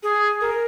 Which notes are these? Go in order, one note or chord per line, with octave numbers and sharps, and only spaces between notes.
G#4
A#4